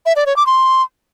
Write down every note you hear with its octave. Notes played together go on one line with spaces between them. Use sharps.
E5
D5
C#5
D6
C6